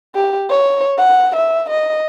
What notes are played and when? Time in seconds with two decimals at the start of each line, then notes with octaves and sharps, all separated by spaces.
0.15 G4
0.50 C#5
0.98 F#5
1.36 E5
1.70 D#5